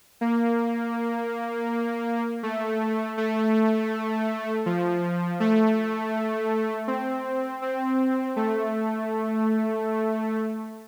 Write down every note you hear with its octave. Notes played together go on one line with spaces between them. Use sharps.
A#3
A3
A3
F3
A3
C4
C4
A3